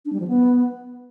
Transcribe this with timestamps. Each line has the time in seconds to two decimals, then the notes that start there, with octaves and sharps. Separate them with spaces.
0.05 D4
0.13 G3
0.20 F3
0.28 B3